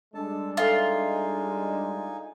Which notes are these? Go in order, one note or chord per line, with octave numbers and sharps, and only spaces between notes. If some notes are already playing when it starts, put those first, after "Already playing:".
G3 G#3 D4 A4 A5
D#4 F4 A4 E5 G#5